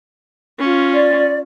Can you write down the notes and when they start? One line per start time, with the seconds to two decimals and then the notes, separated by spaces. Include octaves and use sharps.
0.59 C#4 F4
0.93 D5